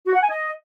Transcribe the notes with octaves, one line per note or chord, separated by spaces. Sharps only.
F#4
F#5
G#5
D#5